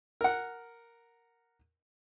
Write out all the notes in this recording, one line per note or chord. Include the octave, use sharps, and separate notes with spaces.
A#4 F#5